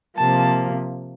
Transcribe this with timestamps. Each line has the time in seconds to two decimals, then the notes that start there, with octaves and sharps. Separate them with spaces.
0.17 C3 F3 A#3 A5